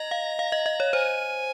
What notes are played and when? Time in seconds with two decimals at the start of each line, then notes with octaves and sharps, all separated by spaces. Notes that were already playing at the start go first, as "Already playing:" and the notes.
Already playing: D#5 A#5
0.11 F5
0.39 F5
0.52 D#5
0.66 D#5
0.80 C#5
0.93 C5 G#5